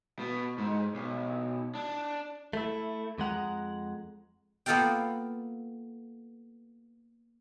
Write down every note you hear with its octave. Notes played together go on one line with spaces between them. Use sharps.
B2
G#2
B1
D4
A3 E4
F2 G#3 F#5 A#5
A#3 B3 F4 A4 F5 G5